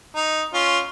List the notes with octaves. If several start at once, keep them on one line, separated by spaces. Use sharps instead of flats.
D#4
C#4 F4